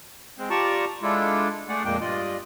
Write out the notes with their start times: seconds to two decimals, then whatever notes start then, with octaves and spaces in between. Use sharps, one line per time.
0.38 G#3 C4
0.50 F4 G4 D5 A5 A#5 C#6
1.03 G#3 D4 E4 F4 A4
1.69 A3 D4 G#4 D5 F#5
1.85 F2 A#2 G#3 A#3 D4 G5
2.01 G2 F4 D5 D#5